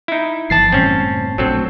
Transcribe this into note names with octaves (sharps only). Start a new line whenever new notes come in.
D#4 E4
G1 E3 F3 A5 A6 C7
F#1 A2 G3 C4 C#4
A#1 F#3 A3 C4 D4 A4